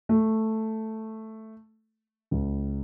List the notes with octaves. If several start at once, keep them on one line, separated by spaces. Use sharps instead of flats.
A3
C#2